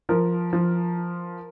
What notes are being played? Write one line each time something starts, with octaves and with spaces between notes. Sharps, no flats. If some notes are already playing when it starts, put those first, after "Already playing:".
F3 A#4
F3